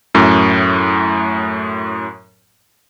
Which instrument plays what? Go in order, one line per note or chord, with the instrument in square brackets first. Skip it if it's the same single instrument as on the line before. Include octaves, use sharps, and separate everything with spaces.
[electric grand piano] F#2 A2